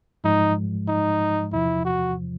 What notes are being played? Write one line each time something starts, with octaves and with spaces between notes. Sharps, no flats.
G#2 F3 G#3 D#4
D#4
E2 C3 F3 E4
F#4